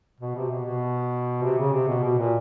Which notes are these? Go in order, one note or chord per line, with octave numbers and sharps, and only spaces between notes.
B2
C3
B2
B2
C3
C#3
C3
B2
B2
A#2